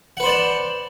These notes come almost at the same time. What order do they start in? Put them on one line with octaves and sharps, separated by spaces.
F#5 B4 C5 D5 A5